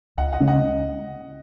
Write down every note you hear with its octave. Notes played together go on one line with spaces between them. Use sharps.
C#2 D#5 F#5
D#5 F#5
C#3 G#3 C#4
D#5 F#5